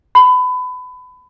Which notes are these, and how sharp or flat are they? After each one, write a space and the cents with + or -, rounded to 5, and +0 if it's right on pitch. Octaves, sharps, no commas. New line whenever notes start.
B5 +25